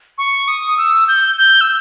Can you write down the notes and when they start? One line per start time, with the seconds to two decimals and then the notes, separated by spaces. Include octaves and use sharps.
0.18 C#6
0.48 D#6
0.78 E6
1.08 G6
1.38 G6
1.61 E6